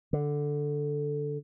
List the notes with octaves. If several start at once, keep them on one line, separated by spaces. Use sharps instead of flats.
D3